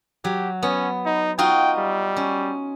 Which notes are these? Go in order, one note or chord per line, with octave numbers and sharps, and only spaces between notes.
F#3 G4
B3 C#4
D#4
D#4 F4 F#4 G5
G3
C#4